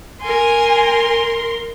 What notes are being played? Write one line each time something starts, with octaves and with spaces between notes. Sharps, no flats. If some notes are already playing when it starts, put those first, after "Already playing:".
A#4 G#5 C6